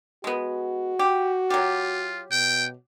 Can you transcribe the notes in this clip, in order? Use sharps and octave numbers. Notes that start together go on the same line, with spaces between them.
G#3 B3 F#4
G4
F#3 F4 G4
B2 G5